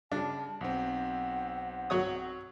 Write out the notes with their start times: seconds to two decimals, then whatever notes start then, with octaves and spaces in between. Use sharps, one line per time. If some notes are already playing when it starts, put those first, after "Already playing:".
0.12 C#3 G3 D4 A5
0.61 B1 C4 F#5
1.90 F#3 C#5 D#6